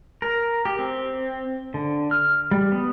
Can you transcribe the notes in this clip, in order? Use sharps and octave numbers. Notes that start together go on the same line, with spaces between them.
A#4
G4
C4
D3
F6
G3
B3